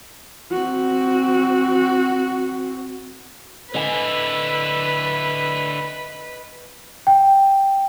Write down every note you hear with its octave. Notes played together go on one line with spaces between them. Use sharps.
C4 F#4
D3 E4 B4 D#5 G#5
G5